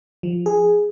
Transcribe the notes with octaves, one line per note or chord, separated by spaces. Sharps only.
F3
G#4